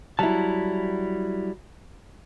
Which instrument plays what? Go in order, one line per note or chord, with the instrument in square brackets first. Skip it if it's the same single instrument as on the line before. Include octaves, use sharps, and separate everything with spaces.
[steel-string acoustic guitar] F#3 E4 [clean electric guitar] G3 A5